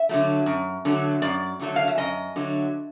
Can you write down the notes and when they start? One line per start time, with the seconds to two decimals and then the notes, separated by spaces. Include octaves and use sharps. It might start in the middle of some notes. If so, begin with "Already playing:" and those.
Already playing: E5
0.09 D3 F#3 A3
0.46 F#2
0.85 D3 F#3 A3
1.22 F#2 D5
1.60 D3 F#3 A3
1.76 F5
1.88 E5
1.98 F#2 D#5
2.36 D3 F#3 A3